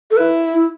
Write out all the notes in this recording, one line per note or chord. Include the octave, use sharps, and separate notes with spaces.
A4
E4 B4
E4